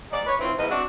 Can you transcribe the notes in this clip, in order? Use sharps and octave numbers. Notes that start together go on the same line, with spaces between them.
G#2 D#4 D5
B4 C#5
D#3 E3 C4 E4 F4
E2 G#2 E3 B4 D#5
C4 D4 F#4